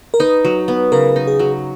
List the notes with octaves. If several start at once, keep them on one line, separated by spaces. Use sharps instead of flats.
A#4
D#4 B4
F#3
B3
C#3 A#4
D#4
G#4
F#3